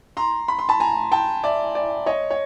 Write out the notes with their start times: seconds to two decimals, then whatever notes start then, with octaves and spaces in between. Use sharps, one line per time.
0.17 A#5 C6
0.48 B5
0.59 C6
0.69 A5 B5
0.80 G#5 A#5
1.12 G5 A5
1.44 D5 E5
1.75 D5 E5
2.06 C#5 D#5
2.31 C#5